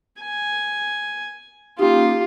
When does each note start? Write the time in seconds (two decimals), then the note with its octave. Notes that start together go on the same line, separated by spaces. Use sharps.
0.21 G#5
1.79 A#3 C#4 D#4 F4 G4